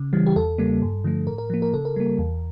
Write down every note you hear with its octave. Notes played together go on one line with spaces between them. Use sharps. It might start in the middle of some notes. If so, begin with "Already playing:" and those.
Already playing: C#3
E3 G3
G4
E2 A4
C#3 G3 A#3
G2
D3 F3 A3
A2 A#4
A#4
F3 A#3
A#4
C#3 A4
A#4
G3 A#3
E2